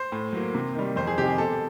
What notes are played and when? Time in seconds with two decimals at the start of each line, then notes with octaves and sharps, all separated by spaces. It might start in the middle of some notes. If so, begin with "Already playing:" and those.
Already playing: C5
0.12 A2
0.33 F#3 A#3
0.55 C3
0.75 D#3 G3
0.96 F2 C5
1.07 G#4
1.18 C3 D#3 G4
1.28 G#4
1.38 B2 A4